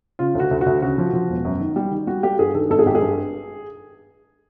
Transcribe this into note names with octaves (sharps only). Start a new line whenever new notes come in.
C#3 F4
D2 F#4
D2
F#4
D2
C#3 F#4
F3
F3
E1
F#2
D#3
G3
D#3
G3 F#4
G3 G4
G2 G#4
D#3 A4
G#1 A4
G#4
G#1 G4
G#4
G2